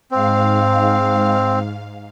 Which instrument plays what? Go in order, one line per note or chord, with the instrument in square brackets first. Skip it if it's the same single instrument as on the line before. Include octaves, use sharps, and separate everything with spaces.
[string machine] G#2 F5 [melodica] C4